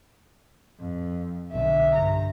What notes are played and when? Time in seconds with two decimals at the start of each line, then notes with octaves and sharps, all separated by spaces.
0.80 F2
1.52 B1 D3 E5
1.95 G2 A#5